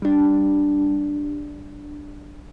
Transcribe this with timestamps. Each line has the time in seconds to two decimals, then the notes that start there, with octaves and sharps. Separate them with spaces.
0.02 G3 D4